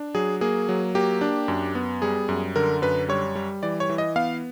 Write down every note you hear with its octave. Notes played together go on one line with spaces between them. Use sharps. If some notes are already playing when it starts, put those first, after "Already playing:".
Already playing: D4
F#3 G#4
A#3 G#4
F#3
A#3 G4
D4
F#2
B3
G3 G#4
F#2
D3 A#4
F#2 B4
G3 C#5
G3
E3 D5
C#5
E3
D#5
B3 F5